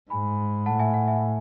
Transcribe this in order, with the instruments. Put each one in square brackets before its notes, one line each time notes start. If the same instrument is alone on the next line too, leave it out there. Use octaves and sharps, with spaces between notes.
[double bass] G#2 [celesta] G#5 B5
[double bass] A2 [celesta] F#5 A5
[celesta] E5 G#5
F#5
E5 G#5